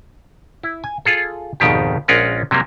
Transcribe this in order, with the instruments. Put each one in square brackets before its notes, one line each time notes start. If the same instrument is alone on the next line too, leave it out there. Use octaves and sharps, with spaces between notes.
[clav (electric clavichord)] E4
G#5
F4 G#4 A4
G#1 F2 B2 D#3 G4
A#1 G#3 C#4 F4 A#4 F#5
C3 F#3 G3 A#3